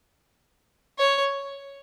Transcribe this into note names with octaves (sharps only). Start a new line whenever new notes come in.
C#5